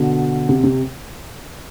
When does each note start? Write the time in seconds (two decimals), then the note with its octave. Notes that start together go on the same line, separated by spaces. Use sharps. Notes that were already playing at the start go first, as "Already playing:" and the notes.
Already playing: B2 D3
0.49 C3
0.64 C3